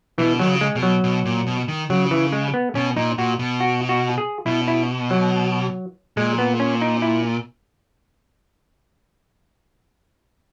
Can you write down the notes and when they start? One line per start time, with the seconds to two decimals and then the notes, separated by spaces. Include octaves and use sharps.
0.18 B2 E3
0.39 D#3 F#3
0.47 C#3
0.61 G#3
0.75 B2
0.83 F#3
1.04 B2
1.25 A#2
1.47 B2
1.68 D#3
1.90 C#3 F#3
2.11 E3
2.32 G#3
2.54 B3
2.75 B2 C#4
2.97 A#2 D#4
3.18 A#2 F#4
3.39 B2
3.60 F#4
3.89 F#4
4.18 G#4
4.46 B2 E4
4.68 E4
5.11 F#3
6.17 A#2 G#3
6.38 B3
6.60 C#4
6.82 D#4
7.02 E4